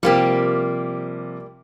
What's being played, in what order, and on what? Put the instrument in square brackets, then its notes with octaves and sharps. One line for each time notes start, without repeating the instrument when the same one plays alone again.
[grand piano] C3 F3 [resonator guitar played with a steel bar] G3 A#3 G4